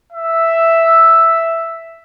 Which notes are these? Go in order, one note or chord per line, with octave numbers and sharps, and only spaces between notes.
E5